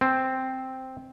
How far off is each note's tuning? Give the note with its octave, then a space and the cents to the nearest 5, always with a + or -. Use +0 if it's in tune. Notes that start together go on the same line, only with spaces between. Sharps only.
C4 +0 A5 -40